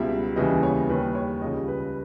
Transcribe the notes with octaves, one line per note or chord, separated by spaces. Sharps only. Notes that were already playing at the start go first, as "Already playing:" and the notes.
Already playing: C#2 B2 G3 E5
D#2 C#3 E3 G3 D#5
C#5
D#2 D#3 G3 B4
C#5
C#2 C#3 G3 D#5
B4